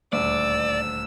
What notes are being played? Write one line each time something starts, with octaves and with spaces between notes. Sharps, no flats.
D#1 D2 D5 E6